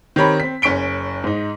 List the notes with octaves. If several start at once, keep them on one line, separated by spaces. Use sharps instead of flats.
D#3 C4 G4 C#5 A#5 B5
C4 B6
F#1 C#4 C#6 B6 D7 G7
G#2 D#4